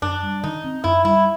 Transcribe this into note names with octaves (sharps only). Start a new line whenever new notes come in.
F#2 D4
G3
D#3 D#4
C4
F#2 E4
G3 E4